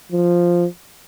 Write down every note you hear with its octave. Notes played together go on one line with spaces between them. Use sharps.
F3